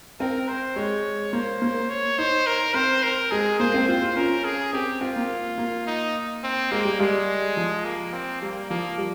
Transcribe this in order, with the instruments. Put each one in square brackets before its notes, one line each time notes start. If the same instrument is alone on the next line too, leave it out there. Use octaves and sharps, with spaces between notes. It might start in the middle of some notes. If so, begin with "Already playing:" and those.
[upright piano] C4 [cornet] A#4
[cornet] C5
[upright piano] G#3 [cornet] C#5
[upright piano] A#3 [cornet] C5
[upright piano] A#3
[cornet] C#5
[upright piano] D#4 [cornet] C5
[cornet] A#4
[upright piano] C4 [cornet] C5
[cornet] A#4
[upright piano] G#3 [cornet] G#4
[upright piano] A#3 [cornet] C5
[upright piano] C4
[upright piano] F4 [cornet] C5
[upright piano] F4
[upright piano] C#4 [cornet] A#4
[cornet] G#4
[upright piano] C4 [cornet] G4
[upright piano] C4 [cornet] F4
[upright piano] A#3
A#3
[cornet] D#4
C4
[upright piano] G#3 [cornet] A#3
[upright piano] G3
[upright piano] G3 [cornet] G#3
[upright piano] F3
[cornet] A#3
C4
[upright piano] G3 [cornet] A#3
[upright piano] F3 [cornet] A#3
[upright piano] G3